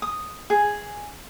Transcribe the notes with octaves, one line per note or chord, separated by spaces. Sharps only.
D#6
G#4